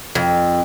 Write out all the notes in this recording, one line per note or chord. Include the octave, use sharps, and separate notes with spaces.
F2